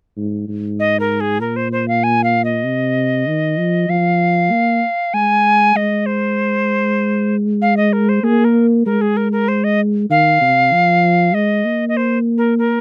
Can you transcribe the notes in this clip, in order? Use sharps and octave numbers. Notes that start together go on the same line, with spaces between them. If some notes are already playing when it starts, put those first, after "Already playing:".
G#2
G#2
D#5
A#4
G#4
A#2 A#4
C5
C5
F5
G#5
F5
D#5
C3
D#3
F3
F3 F5
A#3
G#3 G#5
G#3 D#5
C5
F5
D#5
A#4
C5
A#3 G#4
A#4
G#3 A#4
G#4
A#4
A#4
C5
D#5
D#3 F5
C3
F3
G#3 D#5
A#3
D#5
C5
A#4
A#4